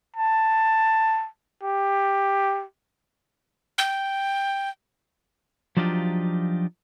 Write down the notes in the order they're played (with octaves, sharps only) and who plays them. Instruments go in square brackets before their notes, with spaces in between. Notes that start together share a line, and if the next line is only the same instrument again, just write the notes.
[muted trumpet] A5
G4
[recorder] G5
[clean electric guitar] F3 F#3 D4 D#4 F4 G4